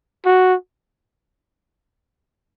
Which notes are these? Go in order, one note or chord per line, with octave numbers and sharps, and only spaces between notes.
F#4